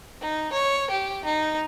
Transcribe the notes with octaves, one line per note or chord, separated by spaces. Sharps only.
D#4
C#5
G4
D#4